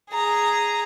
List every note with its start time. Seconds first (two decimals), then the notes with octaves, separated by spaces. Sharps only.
0.10 G#4 A#5